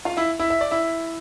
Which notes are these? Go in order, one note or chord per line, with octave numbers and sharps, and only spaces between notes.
F4 F5
E4 E5
E4 E5
E5
D5
E4 E5